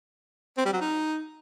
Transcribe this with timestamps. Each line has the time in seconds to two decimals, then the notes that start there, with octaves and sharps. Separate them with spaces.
0.58 C4
0.65 G3
0.73 F#3
0.81 D#4